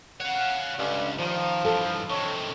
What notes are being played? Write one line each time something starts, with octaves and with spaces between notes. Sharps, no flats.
C#5 F5 F#5
C#2 G2 D3 C#4
D#3 F3
G2 E3 A4
C3 D#3 C#5